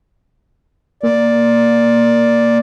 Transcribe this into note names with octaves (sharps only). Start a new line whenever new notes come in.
A#3 D5